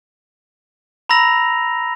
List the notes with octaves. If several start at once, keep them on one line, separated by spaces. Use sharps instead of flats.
A#5 B5 E6 A#6 F7